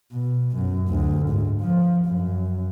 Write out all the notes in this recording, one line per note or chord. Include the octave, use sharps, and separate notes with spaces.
B2
F#2
D2
G#2
F3
F#2